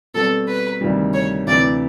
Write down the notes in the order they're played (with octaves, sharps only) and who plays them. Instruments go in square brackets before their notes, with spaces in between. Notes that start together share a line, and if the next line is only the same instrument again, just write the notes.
[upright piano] B2 G3 C4 [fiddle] A4
[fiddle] B4
[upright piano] D2 C3 D#3 G3
[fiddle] C#5
[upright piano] D2 C3 E3 [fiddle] D5